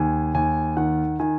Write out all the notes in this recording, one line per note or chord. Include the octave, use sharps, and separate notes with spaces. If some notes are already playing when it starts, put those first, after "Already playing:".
Already playing: D#2 G#5
D#2 G#5
D#3 F#5
D#3 G#5